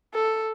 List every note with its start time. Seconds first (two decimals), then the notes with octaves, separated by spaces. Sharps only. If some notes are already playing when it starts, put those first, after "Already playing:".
0.14 A4